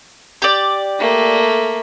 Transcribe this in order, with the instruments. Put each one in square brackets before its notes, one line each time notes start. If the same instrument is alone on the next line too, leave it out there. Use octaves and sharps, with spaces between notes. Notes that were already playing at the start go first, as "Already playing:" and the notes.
[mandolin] G4 D5
[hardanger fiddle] A3 A#3